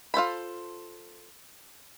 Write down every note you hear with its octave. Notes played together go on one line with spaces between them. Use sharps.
F4 A4 C5 B5